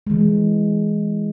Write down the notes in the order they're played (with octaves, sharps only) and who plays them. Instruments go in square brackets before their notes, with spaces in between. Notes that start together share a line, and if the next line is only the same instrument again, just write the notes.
[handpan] E3 G#3